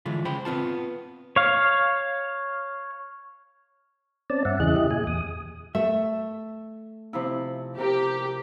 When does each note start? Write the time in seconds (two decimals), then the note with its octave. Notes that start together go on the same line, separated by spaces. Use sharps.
0.06 D3 E3 G#3 E4 F4
0.25 C#3 C5 G5 B5
0.45 B3 C4 F4 A5
1.36 C#5 F5
4.30 C4 C#4 D5 A5
4.45 G2 E5 F#5
4.60 E2 C#3 E3 G#4 D#5 F#6
4.76 E4 G4 D#5
4.91 A#2 G#4 G#5
5.07 E2 D#6
5.75 A3 E5
7.13 C3 F3 E4
7.78 C3 G4 A#4